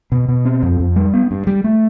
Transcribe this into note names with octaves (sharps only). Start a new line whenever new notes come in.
B2
B2
C4
F2
F2
G3
B3
G2
G3
A3